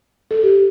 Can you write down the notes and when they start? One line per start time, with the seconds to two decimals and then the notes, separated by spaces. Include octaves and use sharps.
0.31 A4
0.43 G4